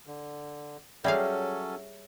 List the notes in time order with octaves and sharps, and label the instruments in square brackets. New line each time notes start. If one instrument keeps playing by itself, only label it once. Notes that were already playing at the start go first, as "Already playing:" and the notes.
[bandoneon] D3
[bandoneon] F#3 C#4 A4 [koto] G3 G#4 F5 [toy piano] C#5 E5